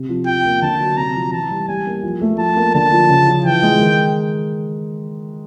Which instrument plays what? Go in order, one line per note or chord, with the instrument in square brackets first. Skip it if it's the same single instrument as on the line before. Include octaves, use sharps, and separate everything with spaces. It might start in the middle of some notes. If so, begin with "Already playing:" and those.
Already playing: [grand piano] C3
F3
[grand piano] F3 [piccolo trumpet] G5
[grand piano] A#3
[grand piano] D3 [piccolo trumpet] A5
[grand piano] F#3
[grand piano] C3 [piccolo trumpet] A#5
[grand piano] F3
[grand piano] E3 [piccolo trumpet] A5
[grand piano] G3
[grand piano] G3 [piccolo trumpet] G#5
[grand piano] A#3
F3
A3
[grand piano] F3 [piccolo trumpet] A5
[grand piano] A#3
[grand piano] D3 [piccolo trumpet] A5
[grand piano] F3
C#3
F3
[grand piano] E3 [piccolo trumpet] G5
[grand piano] G#3
D#3